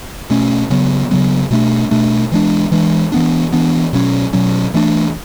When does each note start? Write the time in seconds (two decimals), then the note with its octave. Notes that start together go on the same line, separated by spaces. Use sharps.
0.30 B2 A3 C#4
0.70 C#3 F#3 B3
1.11 C#3 F#3 B3
1.51 B2 A3 D4
1.91 B2 A3 D4
2.32 E3 G#3 D4
2.71 E3 G#3 D4
3.12 E3 B3 D4
3.53 E3 B3 D4
3.93 B2 F#3 C#4
4.33 B2 F#3 C#4
4.74 E3 A3 D4